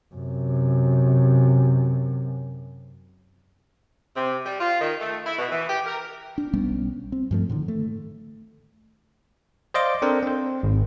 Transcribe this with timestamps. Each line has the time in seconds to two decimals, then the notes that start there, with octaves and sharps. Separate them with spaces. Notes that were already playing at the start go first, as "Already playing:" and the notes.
0.15 F#2 C3
4.16 C3
4.46 G3
4.61 F4
4.81 D#3
5.00 A3
5.26 E4
5.39 B2
5.52 E3
5.68 G4
5.86 A#4
6.38 D4
6.53 B1 G3 B3 C#4
7.12 C4
7.31 G2 F3 A3
7.50 A2 D3 D#3
7.68 A3
9.74 C5 D5 D#5 F5 C6 D6
10.02 C4 D4 A4 A#4 C5
10.23 C4 C5
10.63 G#1